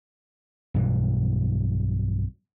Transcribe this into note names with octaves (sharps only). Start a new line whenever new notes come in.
B1 G2 B2 E3